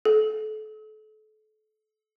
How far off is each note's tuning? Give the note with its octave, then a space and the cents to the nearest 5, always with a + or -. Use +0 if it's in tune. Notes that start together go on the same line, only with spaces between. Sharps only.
A4 -30